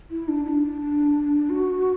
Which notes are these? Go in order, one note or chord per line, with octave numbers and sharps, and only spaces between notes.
E4
D4
E4
D4
F#4